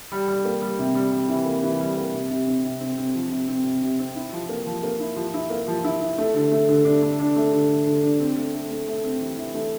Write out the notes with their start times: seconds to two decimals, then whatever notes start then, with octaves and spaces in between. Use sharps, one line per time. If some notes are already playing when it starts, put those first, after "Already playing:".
0.12 G3
0.28 G3
0.45 A#3
0.62 G3
0.79 C3
0.95 G3
1.12 G3
1.29 E3
1.46 A#3
1.63 E3
1.80 G3
1.97 A#3
2.14 C3
2.30 C3
2.47 C4
2.64 C3
2.81 C4
2.97 C4
3.15 F3
3.32 C3
3.48 C4
3.64 C3
3.82 C3
3.99 C4
4.16 E4
4.33 F3
4.49 A#3
4.66 F3
4.83 A#3
5.00 E4
5.16 F3
5.34 E4
5.50 A#3
5.68 F3
5.84 E4
6.01 E4
6.18 A3
6.34 D3
6.51 A3
6.68 D3
6.85 D4
7.02 A3
7.19 D4
7.36 A3
7.52 D3
7.69 D3
7.86 D3
8.03 D4
8.20 C4
8.36 A3
8.54 A3
8.71 A3
8.88 A3
9.04 C4
9.21 E3
9.37 E3
9.54 A3